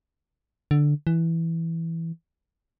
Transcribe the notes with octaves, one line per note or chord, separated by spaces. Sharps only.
D3
E3